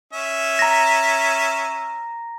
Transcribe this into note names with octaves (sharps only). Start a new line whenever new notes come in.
C#4 E5
A#5 A#6